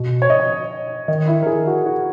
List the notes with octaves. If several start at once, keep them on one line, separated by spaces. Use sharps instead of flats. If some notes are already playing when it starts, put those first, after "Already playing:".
Already playing: B2
C#5
D#5
C#5
D#3 D#5
E4
A#4
G#4
F#4
F#4